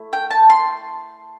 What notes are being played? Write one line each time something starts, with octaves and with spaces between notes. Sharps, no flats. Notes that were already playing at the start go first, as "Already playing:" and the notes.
Already playing: A3 E4
G5
A5
C6